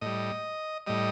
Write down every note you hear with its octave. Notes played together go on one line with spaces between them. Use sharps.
A2 G3 D#5
A2 G3 D#5